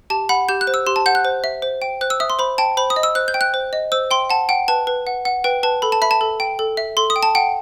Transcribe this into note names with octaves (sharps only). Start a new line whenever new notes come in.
G4 A5
F#5 B5
G4 G6
F#6
C5
E6
G4 C6
A5
F#5 G6
F#6
C5
E5
C5
G5
C5 F#6
E6
E5 D#6
C6
C5 B5
G5 A5
C5 B5
D#6
D#5
E6
C5 F#6
G6
G5
F#6
C5
D#5
C5 E6
G5 C6
F#5 A5
F#5 G5
B4 A5
B4
F#5
F#5
B4 G5
B4 A5
A4 B5
A5
E5 B5
A5
A4
G5
A4
E5
A4 C6
D#6
G5
A5
F#5 G5